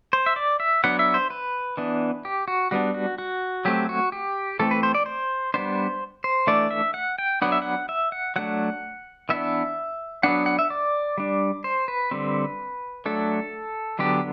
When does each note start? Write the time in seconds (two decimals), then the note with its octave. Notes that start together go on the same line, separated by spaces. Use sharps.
0.13 C5
0.26 E5
0.36 D5
0.60 E5
0.84 F#3 B3 D4 F#5
0.99 E5
1.14 C5
1.30 B4
1.77 E3 B3 D4
2.25 G4
2.48 F#4
2.71 G3 B3 D4 F#4
2.94 F#4
3.18 F#4
3.65 F#3 A3 C4 G4
3.89 F#4
4.12 G4
4.59 E3 A3 C4 A4
4.71 B4
4.83 C5
4.95 D5
5.06 C5
5.54 G3 B3 D4 C5
6.24 C5
6.47 E3 A3 D4 D5
6.71 E5
6.94 F#5
7.18 G5
7.42 F#3 B3 D4 F#5
7.52 E5
7.62 F#5
7.89 E5
8.12 F#5
8.36 F#3 A3 D4 F#5
9.29 E3 B3 D4 E5
10.23 F#3 B3 D4 F#5
10.46 F#5
10.59 E5
10.70 D5
11.18 G3 D4
11.64 C5
11.88 B4
12.11 D3 G3 C4
13.06 F#3 A3 D4 A4
13.99 D3 F#3 B3 D4 G4